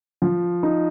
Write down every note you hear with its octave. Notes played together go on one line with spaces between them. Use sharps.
F3
D#4